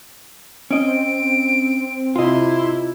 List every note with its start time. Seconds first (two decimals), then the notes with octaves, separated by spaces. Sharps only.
0.71 C4 C#4 D#5 D7
2.16 C3 E4 F4 D#5 C6